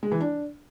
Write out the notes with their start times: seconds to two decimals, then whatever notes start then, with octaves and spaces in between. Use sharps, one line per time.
0.03 G#3
0.12 E3
0.20 D4